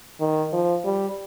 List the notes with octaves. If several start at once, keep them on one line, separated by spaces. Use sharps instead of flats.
D#3
F3
G3